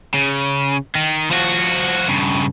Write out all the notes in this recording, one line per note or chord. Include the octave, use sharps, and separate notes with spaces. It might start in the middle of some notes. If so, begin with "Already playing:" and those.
C#3
D#3
F3 F#4
G2 C#3